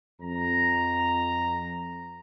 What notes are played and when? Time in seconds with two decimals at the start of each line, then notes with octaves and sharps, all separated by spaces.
0.21 F2 A#5